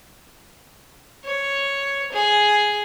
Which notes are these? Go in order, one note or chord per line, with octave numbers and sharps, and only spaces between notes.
C#5
G#4